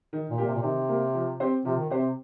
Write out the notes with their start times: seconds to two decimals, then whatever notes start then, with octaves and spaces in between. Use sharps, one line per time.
0.13 D#3
0.30 A#2
0.38 A#3 G4
0.47 C3
0.55 A#2
0.62 C3 D#3
0.89 A#3 G4
1.15 F3
1.40 C4 G4 C5
1.65 C3 F3
1.77 D#3
1.90 C3 C4 G4 C5